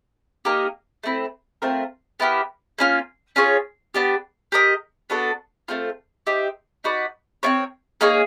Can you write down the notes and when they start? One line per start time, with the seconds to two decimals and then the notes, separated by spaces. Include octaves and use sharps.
0.45 A#3 D#4 G4 A#4
1.04 A3 C4 E4
1.62 A3 C4 F4 A#4
2.20 B3 E4 G4 A#4
2.78 A#3 C#4 F4
3.36 C#4 F4 G#4 C#5
3.94 B3 D4 G4
4.52 G4 A#4 D#5
5.10 B3 D4 F#4 A4
5.68 A3 C4 F4
6.27 D#4 G4 C5 E5
6.84 D#4 F#4 B4 D5
7.43 C4 F4 A#4 C#5
8.01 A#3 D#4 G#4 C#5